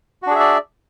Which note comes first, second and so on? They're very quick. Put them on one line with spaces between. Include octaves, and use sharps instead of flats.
F#4 D4 G#4 E5 D5